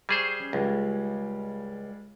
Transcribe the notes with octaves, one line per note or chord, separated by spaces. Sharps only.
G3 G#4 C5 C#6 G#6
C#4
C#2 G3 G#3 F4